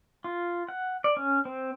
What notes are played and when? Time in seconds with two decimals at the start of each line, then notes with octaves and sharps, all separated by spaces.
0.24 F4
0.69 F#5
1.04 D5
1.17 C#4
1.45 C4